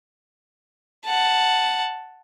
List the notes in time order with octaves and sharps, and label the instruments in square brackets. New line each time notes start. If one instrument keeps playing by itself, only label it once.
[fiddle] F#5 A5